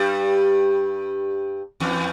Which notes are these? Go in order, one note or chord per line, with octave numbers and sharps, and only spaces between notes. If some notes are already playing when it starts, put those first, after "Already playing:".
Already playing: G2 G3
E2 E3